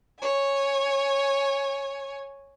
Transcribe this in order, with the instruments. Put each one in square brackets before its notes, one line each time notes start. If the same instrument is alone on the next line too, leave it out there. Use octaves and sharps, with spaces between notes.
[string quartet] C#5 G#5